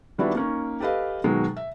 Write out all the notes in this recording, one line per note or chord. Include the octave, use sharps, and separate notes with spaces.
D#3 G3 B3 D4 E4 F#4
A#3 C#4 D#4
G4 A4 B4 D#5 F5
B2 D#3 F#3 G#3
E5